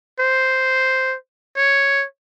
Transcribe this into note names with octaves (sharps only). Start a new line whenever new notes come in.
C5
C#5